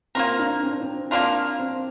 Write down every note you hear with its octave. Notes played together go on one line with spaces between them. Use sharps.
A#3 C4 F4 A#4
D4
C4
D4
C4
A#3 D4 F4 A#4
C4